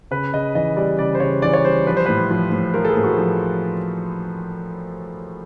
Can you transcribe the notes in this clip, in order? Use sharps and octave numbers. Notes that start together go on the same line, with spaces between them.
C#3 B4
C#3 D#5
E3 D#5
G3 D5
C#3 D5
C5
C#3 C#5
E3 D5
C#5
G3 C5
F3 B4
C5
A2 B4
F3
A2
F3 A#4
A4
G#4
A2
F#4
F3